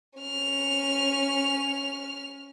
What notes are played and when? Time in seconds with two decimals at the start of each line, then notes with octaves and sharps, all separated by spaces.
0.19 C#4 F6